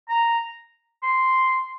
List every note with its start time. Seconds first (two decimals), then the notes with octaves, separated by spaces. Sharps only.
0.09 A#5
1.03 C6